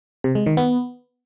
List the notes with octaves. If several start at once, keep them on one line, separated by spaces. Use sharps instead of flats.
C3
G#3
D#3
B3